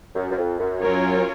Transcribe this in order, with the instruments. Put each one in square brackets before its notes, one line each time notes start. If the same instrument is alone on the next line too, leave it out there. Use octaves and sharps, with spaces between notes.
[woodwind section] F#2
F#2
F2
F#2
[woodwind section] F#2 [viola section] F#3 C#4 F4 A#4 C#5